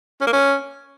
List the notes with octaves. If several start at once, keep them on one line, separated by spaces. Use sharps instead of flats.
C#4
A#3
C#4